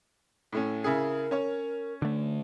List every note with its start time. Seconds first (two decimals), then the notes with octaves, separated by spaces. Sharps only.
0.53 A2 A3 C#4
0.84 C#3 E4 G#4 A#4
1.31 C#4 C#5
2.02 D3 A3